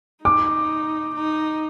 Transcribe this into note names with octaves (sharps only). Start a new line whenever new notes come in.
D#4 D6
D#4